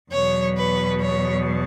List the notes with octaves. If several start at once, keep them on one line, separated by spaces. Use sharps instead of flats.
E2 B2 F#3 C#5
B4
C#5